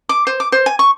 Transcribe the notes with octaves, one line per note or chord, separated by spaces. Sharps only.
D6
C5
D6
C5
G#5
C#6